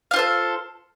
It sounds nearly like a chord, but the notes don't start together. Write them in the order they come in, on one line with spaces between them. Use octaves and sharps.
F5 F4 C5 A4